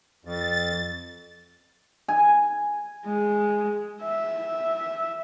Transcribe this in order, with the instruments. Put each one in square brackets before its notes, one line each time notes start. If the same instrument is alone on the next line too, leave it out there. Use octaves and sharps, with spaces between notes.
[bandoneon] F2 [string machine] A6
[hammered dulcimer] G#5
[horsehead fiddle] G#3
E5